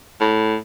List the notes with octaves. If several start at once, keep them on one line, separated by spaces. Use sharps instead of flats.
A2